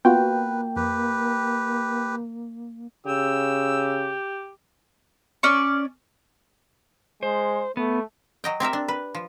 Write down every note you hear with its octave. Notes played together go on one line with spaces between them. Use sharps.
A#3 B3 F4 F#4 B4 G5
F2 G4 B4
C#3 G4 E6
C#4 D5 C#6
G#3 C5
A3 B3
F#3 D#5 G5
C4 G4 A#4 E5
D4
B4
F3